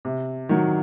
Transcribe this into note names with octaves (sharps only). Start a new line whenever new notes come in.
C3
D#3 F#3